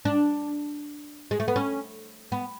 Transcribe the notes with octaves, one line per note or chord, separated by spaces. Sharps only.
D4
G#3
A3
B3
C#4
B3